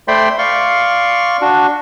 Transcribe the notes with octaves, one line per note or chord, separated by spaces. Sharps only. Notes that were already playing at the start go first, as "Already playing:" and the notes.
A3 C5 D5 G5 B5 C6
D5 F5 C6 C#6
D4 F#4